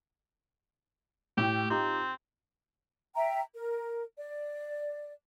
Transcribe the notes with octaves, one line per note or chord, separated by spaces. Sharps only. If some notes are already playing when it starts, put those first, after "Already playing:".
A2 E4 G4 G5
C4 D#4 F4 G4
E5 G5 A#5
A#4
D5